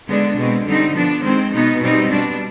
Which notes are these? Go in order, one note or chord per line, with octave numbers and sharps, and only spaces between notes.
D3 G#3 B3 D4
B2 G#3 C4
D3 G3 C4 D#4
F3 B3 D4
D#3 G#3 C4
B2 B3 D#4
B2 G3 C4 D#4
B2 G3 D4